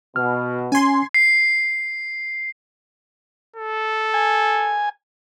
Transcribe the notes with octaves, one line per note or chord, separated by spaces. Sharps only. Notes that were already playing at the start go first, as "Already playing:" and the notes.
B2 F6
C#4 G#5 C6
C7
A4
G#5